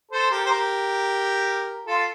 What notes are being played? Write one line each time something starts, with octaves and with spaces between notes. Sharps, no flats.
A4 C5
G4 A#4
C5
G4 A#4
F4 A4